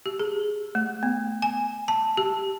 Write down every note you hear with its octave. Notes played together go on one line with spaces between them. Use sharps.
G4
G#4
A3
B3
G#5
A5
G4